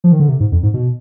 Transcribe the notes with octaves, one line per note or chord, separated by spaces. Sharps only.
F3
D#3
D3
C3
G#2
F2
G#2
B2